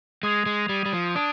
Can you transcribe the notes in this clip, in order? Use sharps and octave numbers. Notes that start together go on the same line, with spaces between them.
G#3 D#6 G#6 C7 F7
G#3
G3 G#6 C7 D#7
G3
F3
D4 D#6 G#6 D7